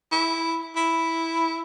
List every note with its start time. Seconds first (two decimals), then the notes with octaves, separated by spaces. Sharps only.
0.12 E4
0.76 E4